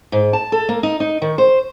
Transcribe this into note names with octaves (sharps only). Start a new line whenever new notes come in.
G#2
A5
A4
A#3
D#4
D#4
D#3
C5